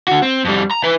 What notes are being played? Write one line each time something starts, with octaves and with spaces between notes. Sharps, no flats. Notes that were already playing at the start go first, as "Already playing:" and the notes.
D3 F#4
C4
F2 G3
A#5
E4 B4